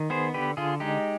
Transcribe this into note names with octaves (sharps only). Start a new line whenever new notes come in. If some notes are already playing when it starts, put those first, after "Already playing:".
Already playing: D#3
B3 G#4 C5
D3 G4 B4
D3 F4 G#4
G#3 D#4 G4